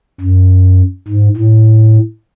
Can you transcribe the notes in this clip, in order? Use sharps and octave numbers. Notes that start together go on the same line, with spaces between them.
F#2
G#2
A2